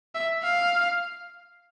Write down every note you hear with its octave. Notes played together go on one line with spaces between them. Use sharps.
E5
F5